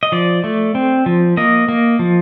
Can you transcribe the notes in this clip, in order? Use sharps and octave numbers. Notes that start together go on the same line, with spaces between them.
D#5
F3 D5
A3
C4
F3
A#3 D#5
A#3
F3